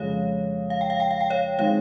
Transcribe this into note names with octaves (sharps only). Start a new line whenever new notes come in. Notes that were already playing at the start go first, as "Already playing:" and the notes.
Already playing: F2 C#3 G#3 C#5 F5
F5
G5
F5
G5
F5
G5
C#5 F5
D#3 G#3 C4 C#5 F5